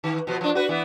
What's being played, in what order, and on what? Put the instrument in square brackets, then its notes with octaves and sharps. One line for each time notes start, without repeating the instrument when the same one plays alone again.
[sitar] D#3
B2 F3
F3 D4
F#4 B4
E3 B3